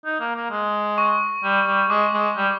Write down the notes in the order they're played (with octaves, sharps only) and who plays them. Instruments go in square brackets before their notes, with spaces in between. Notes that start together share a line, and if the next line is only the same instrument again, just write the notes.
[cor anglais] D#4
A#3
A#3
G#3
[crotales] C#6
[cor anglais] G3
G3
[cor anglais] G#3 [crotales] D6
[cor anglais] G#3
G3